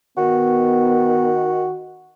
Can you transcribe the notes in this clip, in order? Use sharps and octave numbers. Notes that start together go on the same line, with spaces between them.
D#3 B3 F#4